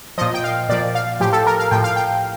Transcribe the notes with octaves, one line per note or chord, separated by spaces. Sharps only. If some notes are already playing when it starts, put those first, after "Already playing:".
A#2 F3 D#5
G5
F5
A#2 F3 D5
F5
A2 F3 G4
A4
A#4
F5
A2 F3 G5
F5
G5